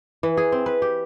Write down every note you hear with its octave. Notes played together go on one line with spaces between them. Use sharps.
E3
G#4
C4
B4
G4